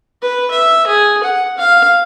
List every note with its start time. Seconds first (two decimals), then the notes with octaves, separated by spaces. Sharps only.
0.22 B4
0.51 E5
0.87 G#4
1.23 F#5
1.57 F5